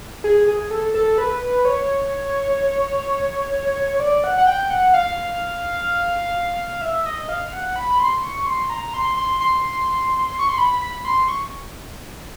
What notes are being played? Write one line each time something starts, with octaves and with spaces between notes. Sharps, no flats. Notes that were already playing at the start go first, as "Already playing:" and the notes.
G#4
G#4
A4
A4
B4
C#5
D5
F#5
F#5
G5
F#5
F5
E5
D#5
F5
F#5
B5
C6
C#6
C6
A#5
C6
C6
C6
C#6
C6
B5
B5
C6
C#6